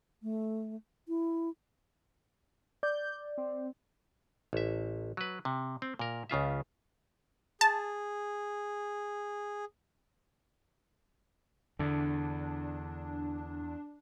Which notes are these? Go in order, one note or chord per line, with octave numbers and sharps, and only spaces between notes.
A3
E4
D5 G6
C4
A1 E5
F#3 B4
C3
C4
A#2 A#4
C#2 C#3 F4 E5
G#4 A5
E2 D3 D4